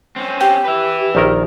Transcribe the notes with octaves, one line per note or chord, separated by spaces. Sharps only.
C4 C#4
G4 G5
B4 E5
A#1 D#3 A#4